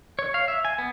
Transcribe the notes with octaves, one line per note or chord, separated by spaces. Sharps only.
C#5
F5
E5
G#5
B3